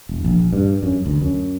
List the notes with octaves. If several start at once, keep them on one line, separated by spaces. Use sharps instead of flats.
E1
A#1
G2
F#2
D2
F#2